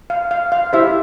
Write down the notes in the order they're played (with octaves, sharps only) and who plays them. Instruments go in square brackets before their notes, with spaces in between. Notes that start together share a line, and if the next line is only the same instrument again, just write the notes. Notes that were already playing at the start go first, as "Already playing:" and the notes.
[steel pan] F5
F5
F5
E4 G4 C5 E5